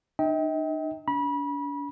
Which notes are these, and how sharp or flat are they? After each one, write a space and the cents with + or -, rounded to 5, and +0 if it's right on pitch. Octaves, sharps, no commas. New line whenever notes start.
D#4 -45 D#5 +45 G5 +0
D4 -40 B5 -30